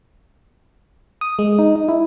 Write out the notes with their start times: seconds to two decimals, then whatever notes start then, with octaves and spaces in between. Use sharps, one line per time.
1.21 D#6
1.39 G#3
1.59 D#4
1.76 D#4
1.88 E4